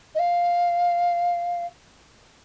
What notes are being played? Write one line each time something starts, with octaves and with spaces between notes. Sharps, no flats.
D#5
F5